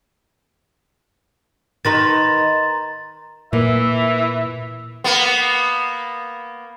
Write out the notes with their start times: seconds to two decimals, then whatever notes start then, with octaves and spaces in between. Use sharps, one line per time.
1.85 D#3 D#4 B4 A#5 C6 A6
3.53 A#2 E3 A#3 E5
5.04 A#3 B3